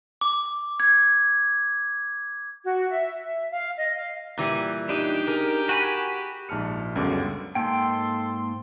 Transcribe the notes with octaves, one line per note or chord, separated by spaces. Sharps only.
D6
G#6
F#4
E5
E5
F5
D#5
F5
A#2 E3 G3
D4 D#4 G4
G#4 A#4
F#4 G#5 B5
A#1 G#2 A5 F6 C#7
C#2 F#2 D3 G3 B3 D6
G#2 A#3 A4 G5 C6